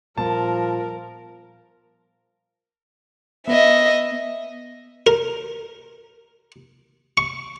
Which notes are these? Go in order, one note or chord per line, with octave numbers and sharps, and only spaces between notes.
A#2 F3 G3 B3 A#4 A5
B3 D#5 E5
A#4
C#6